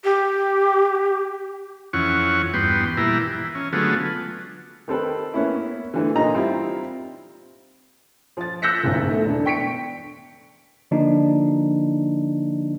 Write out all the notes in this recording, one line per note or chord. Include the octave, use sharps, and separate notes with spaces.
G4
F2 E3 C#4 F#5 C#6
E2 G2 B3 G5 C6
A#2 E3 G3 E4 A#5
E3
C#4
D3 F#3 G#3 A3 B3 F4
D#3 C4 A4 B4
A#3 B3 C#4 E4
D3 E3 A3
A#2 D#4 F4 A#5
G3 C4 E4 F4
F3 A6
E6 F#6 G6 A#6 B6 C#7
F#1 B1 G#2 D#3
A3
E1 D4
G5 C#6 B6 C#7 D7
D3 F3 A#3 D4 D#4